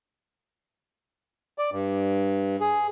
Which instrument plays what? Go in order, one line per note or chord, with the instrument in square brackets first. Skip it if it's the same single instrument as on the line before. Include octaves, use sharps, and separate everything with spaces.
[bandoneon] D5
G2
G#4